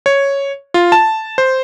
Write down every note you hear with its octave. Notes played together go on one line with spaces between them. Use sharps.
C#5
F4
A5
C5